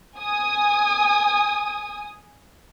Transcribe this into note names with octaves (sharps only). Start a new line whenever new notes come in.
G#5 D#6